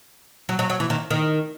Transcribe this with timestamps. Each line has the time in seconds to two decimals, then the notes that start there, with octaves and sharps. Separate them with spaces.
0.49 F#3
0.59 F#3
0.70 F#3
0.80 E3
0.90 D#3
1.11 D#3